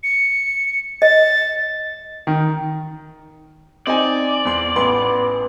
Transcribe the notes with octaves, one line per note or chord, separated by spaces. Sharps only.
C#7
D#5 A6
D#3
C4 D#4 D5 G#5
E2 C6
A1 B3 C6